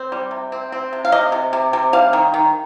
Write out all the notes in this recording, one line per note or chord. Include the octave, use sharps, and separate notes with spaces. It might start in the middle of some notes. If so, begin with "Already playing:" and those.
Already playing: C4
G3
C3
C4
C4
C3
F5
C3 D#5
C3
C3
C3
G3 F5
D#3
D#3